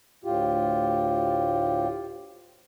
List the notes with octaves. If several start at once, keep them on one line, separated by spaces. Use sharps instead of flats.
D2 A2 F4 G4